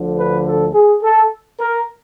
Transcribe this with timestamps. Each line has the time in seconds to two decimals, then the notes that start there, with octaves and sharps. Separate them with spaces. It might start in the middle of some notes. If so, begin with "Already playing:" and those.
Already playing: D2 D3 F3
0.16 B4
0.45 A4
0.74 G#4
1.03 A4
1.60 A#4